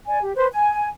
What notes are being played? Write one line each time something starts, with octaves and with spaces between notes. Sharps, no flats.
D5 G#5
G4
B4 C5
G#5